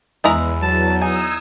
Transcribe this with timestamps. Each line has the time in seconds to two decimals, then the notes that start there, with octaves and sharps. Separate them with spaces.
0.24 E2 G#3 E4 A#5
0.62 F#3 A5
1.02 D#4 G#5 D#6 E6 G#6